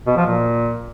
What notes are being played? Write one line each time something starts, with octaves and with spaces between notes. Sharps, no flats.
B2
F3
A#2